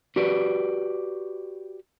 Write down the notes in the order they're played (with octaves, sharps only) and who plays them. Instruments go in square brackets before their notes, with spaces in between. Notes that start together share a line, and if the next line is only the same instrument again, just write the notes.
[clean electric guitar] F#4 G4 B4 D5